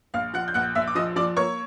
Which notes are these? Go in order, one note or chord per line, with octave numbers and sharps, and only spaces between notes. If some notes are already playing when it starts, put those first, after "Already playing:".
A#1 F5 F6
F3 F#5 F#6
G6
A#1 F#5 F#6
A#1 E5 E6
D6
F3 D#5 D#6
F3 D5 D6
A#3 C#5 C#6